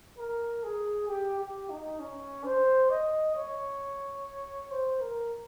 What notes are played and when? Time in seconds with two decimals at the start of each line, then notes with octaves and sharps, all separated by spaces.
0.18 A#4
0.64 G#4
1.08 G4
1.39 G4
1.70 D#4
2.00 C#4
2.45 C5
2.90 D#5
3.35 C#5
4.71 C5
5.01 A#4